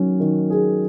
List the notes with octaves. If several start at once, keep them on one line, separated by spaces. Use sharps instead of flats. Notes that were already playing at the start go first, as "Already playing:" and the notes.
Already playing: D#3 F#3 C#4
D#3
G#4